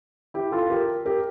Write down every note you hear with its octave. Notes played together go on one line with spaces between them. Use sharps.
E4 G4
F4 A4
G4 A#4
G4 A#4